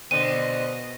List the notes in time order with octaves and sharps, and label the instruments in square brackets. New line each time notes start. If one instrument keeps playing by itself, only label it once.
[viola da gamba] B2 D#5 [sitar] D3 C4 [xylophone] D#7